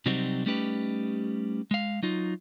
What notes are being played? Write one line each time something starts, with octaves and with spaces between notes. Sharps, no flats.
C3 F#3 G3 C4 D#4 F#4
G3 A3 C#4 D#4 G4 B4
G#3 F5
F#3 D#4 F4